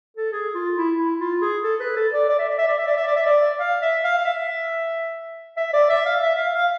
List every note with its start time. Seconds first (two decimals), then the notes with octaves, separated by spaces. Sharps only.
0.17 A4
0.33 G#4
0.55 F4
0.76 E4
0.99 E4
1.20 F4
1.42 G#4
1.64 A4
1.80 B4
1.97 A4
2.13 D5
2.29 D5
2.39 E5
2.49 D5
2.58 E5
2.68 D5
2.78 E5
2.87 D5
2.97 E5
3.08 D5
3.16 E5
3.26 D5
3.60 F5
3.82 E5
4.04 F5
4.18 F5
4.25 E5
5.57 E5
5.73 D5
5.90 E5
6.06 F5
6.23 E5
6.38 F5
6.55 F5